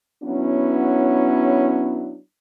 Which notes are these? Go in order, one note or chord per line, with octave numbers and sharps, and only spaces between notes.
F#3 B3 C#4 D4 E4